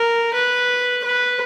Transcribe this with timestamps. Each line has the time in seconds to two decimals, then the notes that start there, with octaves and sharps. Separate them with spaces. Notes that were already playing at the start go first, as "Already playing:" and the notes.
Already playing: A#4
0.34 B4
1.04 B4